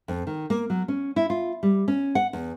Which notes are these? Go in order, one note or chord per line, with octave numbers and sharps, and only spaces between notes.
F2
D#3
A#3
F#3
C#4
E4
F4
G3
C#4
F#5
E2